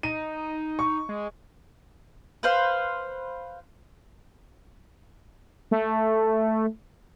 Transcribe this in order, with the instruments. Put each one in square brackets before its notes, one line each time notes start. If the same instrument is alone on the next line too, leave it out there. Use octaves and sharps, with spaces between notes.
[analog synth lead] D#4 [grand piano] D#7
[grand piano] C#6
[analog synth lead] G#3
[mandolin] B4 C5 F5
[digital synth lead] A3